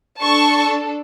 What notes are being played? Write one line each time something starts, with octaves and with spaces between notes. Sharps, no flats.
D4 A4 A5 C#6